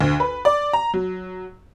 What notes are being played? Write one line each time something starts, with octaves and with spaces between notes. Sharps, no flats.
D2
B4
D5
A#5
F#3